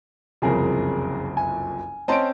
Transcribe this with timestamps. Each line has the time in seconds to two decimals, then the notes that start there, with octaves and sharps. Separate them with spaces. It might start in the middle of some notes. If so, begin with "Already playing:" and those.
0.42 F#1 C2 F2 C#3 G#4 A#4
1.37 G#5
2.08 C4 C#4 D#5 A5 C6 D7